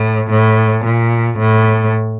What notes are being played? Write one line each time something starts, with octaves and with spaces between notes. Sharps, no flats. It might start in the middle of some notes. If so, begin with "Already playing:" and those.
Already playing: A2
A2
A#2
A2